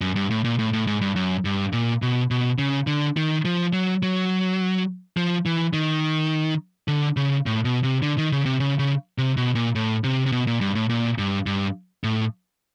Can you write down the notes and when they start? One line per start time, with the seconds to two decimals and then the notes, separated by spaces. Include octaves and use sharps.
0.01 F#2
0.16 G2
0.30 A2
0.44 A#2
0.59 A2
0.73 A2
0.87 G#2
1.01 G2
1.16 F#2
1.45 G2
1.73 A#2
2.02 B2
2.31 B2
2.59 C#3
2.87 D3
3.17 D#3
3.45 F3
3.73 F#3
4.03 F#3
5.17 F3
5.46 E3
5.73 D#3
6.88 D3
7.17 C#3
7.46 A2
7.65 B2
7.83 C3
8.02 D3
8.18 D#3
8.32 C#3
8.46 C3
8.60 C#3
8.79 C#3
9.18 C3
9.37 B2
9.55 A#2
9.75 A2
10.04 C3
10.26 C3
10.32 B2
10.47 A#2
10.61 G2
10.75 A2
10.89 A#2
11.18 G2
11.46 G2
12.04 A2